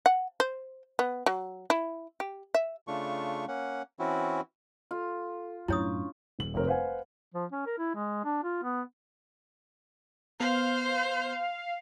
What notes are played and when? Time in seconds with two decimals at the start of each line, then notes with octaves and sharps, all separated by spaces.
0.06 F#5
0.40 C5
0.99 B3
1.26 F#3
1.70 E4
2.20 G4
2.54 E5
2.87 C#3 A3 D4 F4 C#6
3.48 A#3 C#4 F#5
3.99 E3 C4 C#4 E4 F#4
4.91 F4 A4
5.68 F#2 A2 C#4 D4 E4 C#5 C#6 D#6
6.39 D#1 F#7
6.54 F1 F2 C4 A#4 C#5
6.67 B4 C5 F5 F#5 G#5
7.34 F3
7.52 C#4
7.66 A#4
7.78 E4
7.95 G#3
8.24 D4
8.43 F4
8.63 B3
10.40 B3 C5 F5